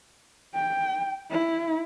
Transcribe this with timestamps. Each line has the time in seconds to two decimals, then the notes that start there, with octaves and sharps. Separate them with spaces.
0.55 G5
1.31 E4